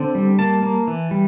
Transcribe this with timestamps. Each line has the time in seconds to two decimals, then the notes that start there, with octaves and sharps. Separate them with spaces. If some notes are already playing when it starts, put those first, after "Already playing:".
Already playing: D3 C4 A5
0.15 G3
0.39 A#3 A5
0.63 A#3
0.87 E3
1.11 G3